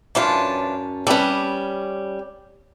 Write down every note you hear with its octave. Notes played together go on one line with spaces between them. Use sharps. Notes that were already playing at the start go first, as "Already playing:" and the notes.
F#2 E3 C#4 D4 F4 A5
G3 C#4 A4 B4